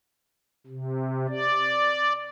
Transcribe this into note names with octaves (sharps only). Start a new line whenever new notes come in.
C3
D5